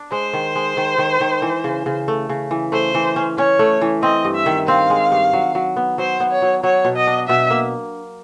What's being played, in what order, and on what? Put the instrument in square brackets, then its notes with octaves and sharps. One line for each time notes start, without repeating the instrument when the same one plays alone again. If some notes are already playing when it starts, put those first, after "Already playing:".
Already playing: [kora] D4
[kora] G#3 [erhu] C5
[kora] D#3
G#3
D#3
D#3
D#3
E3
C#3
C#3
A3
C#3
E3
[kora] A3 [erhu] C5
[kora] E3
C#4
[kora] C#4 [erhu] C#5
[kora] A3
E3
[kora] C4 [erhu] D#5
[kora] G2
[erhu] E5
[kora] D#3
[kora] C4 [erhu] F5
[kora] G#3
G2
F#3
F#3
B3
[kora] F#3 [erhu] C5
[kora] B3
[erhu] C#5
[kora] F#3
[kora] F#3 [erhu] C#5
[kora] B2
[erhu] D#5
[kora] D4
[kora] B2 [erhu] E5
[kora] A#3